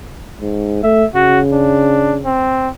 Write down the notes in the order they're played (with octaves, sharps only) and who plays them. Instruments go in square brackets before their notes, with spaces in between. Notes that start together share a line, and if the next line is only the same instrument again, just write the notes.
[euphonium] G#2
[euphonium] A3 [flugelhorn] E5
[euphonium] C#3 [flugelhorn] F#4
[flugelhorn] D4
C4